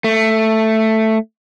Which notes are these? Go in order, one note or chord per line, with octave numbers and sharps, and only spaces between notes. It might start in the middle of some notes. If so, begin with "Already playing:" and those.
A3